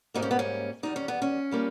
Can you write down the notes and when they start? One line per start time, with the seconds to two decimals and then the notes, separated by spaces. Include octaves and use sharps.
0.14 G#2 G3 A#3 D#4
0.22 C#4
0.31 B3
0.39 C#4
0.83 E2 D#3 G3 D#4
0.96 C#4
1.08 B3
1.22 C#4
1.51 A#2 G3 A#3